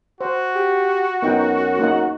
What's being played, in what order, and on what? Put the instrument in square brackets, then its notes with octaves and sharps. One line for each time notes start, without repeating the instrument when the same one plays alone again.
[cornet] F#4 [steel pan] C5
[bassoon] G4
[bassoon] F#2 [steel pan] B3 D#4 G5
[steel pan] A#3 D#4 F#5